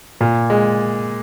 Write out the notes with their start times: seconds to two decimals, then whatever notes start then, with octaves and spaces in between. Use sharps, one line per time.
0.21 A#2
0.50 G#3